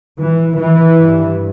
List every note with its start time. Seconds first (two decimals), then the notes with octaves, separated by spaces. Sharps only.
0.19 E3
0.57 E3
0.94 G2